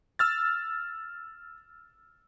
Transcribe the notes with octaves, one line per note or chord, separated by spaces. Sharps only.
E6 F6 A6